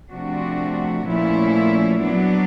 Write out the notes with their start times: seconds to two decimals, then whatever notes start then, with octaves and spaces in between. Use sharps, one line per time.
0.12 C3 F3 A3 D4 F#4
1.07 A#2 F3 A3 C#4 E4
2.02 F#3 B3 D4